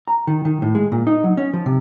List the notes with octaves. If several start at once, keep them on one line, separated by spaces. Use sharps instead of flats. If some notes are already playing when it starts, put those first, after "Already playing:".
A#5
D#3
D#3
A2
G#3
A#2
D#4
F#3
C#4
F3
C3